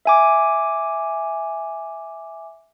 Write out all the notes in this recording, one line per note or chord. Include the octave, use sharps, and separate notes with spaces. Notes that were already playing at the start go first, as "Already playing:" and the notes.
E5 G#5 D6